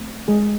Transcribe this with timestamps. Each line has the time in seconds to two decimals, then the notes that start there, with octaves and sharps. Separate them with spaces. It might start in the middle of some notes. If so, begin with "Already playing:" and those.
Already playing: A3 C4
0.28 G#3 G#4